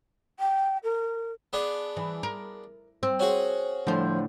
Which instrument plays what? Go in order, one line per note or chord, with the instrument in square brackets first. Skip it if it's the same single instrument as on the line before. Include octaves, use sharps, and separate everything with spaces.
[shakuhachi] G5
A#4
[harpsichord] B3 D4 G#4
[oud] E3
A#4
C4
[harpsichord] C#4 F#4 G#4
[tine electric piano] A2 D3 [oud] F3 C5